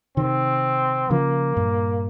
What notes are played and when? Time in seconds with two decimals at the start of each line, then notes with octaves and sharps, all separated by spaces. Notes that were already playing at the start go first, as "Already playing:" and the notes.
0.17 C3 D#3 C4
1.10 C#3 F3 A#3
1.57 G2 A#2